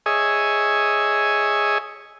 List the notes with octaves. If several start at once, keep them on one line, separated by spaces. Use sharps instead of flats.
G#4 C#5 D#5 E5 G#5